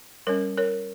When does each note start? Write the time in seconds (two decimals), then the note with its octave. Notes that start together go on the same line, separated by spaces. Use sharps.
0.27 G3 C#4 A#4 C#5
0.57 A#4 C#5